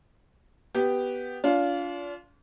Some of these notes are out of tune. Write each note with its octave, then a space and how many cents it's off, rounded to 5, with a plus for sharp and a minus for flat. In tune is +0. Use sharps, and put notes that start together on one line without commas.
B3 +0 G4 -10
D4 -40 F4 +0